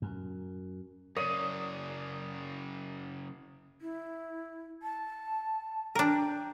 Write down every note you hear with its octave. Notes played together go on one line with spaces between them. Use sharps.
F#2
F#2 C#3 A#4 C#5 D5 D#6
E4
A5
D4 A#4 G5